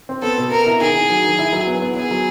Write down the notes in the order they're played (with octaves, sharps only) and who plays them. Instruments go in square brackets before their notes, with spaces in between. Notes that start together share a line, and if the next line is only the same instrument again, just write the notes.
[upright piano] C4
[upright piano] B3 [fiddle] A4
[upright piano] B2
[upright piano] B3 [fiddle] A#4
[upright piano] E4
[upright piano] D#3 [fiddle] G#4
[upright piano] D#3
F#3
D#3
E4
F#3
B3
B3
[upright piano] B3 [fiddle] G#4
[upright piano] F#3